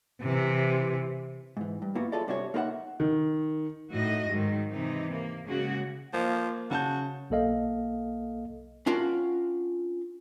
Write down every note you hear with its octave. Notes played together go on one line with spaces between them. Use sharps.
C3 E3
G#2 E3
G2
A#3 B3 E4 F#4
E4 F4 G#4 A4 C#5 D5
G2 C3 D4 F#4 G4 C#5
A#3 D#4 G#4 B4 E5 F#5
D#3
A2 D#4 F#4 D#5
G#2 D#3 F#3
C3 E3 D#4
A#3
C#3 G#3 A#3 C#4 F#4
F3 A#3
C#3 F#4 A5 G6
B1 A#3 A4 D#5 F5
C#4 D4 F4 F#4 A#4 G5